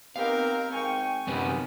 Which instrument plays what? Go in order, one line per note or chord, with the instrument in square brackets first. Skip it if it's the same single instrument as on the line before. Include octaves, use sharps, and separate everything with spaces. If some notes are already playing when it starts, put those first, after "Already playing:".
[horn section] B3 D#4 G4 [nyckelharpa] C4 A#4 [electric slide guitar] F5
[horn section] G#2 G5 G#5 [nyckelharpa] C#6
[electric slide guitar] F#2 C3 C#4 [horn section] D#3 B3 [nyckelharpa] G4